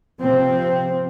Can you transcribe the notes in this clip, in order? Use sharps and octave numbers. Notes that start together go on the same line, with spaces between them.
C3 F3 C4